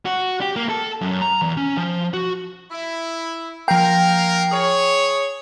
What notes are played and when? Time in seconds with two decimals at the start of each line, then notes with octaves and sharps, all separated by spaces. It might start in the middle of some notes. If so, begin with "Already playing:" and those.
0.06 F#4
0.41 G4
0.56 A#3
0.69 A4
1.01 F#2
1.22 A#5
1.42 E2
1.57 C#4
1.77 F3
2.13 F#4
2.71 E4
3.68 F3 A#3 A#4 G5
4.52 G#4 C#5